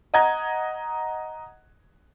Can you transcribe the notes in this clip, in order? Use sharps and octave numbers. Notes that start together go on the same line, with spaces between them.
D#5 F#5 A#5 G#6